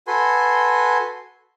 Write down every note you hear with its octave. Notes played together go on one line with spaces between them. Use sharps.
F#4 A4 B4 G#5 C6